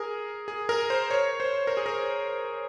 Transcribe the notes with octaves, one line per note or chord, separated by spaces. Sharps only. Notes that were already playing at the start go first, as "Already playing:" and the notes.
Already playing: G#4 A#4
G#4
A#4
C5
C#5
C5
A#4
G#4
A#4